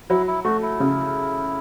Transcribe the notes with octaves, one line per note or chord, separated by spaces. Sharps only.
F#3 E4
E4
A3 F#4
E4
C#3